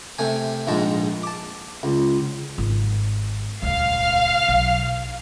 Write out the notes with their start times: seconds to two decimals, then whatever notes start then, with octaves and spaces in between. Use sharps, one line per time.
0.19 C3 A3 G#5
0.67 A#1 G#2 G#3 A5
1.23 A5 D6
1.83 C#2
2.58 G#1
3.62 D#1 C#2 F5
4.48 B1